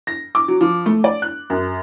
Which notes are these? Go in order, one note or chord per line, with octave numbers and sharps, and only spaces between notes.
A#6
D6
F#3
F3
A3
D5
F#6
F#2